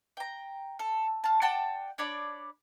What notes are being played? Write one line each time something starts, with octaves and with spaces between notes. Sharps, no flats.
G5 A#5
A4
F4 A5
D5 F#5 G5 A5
D4 C#5 D5 B5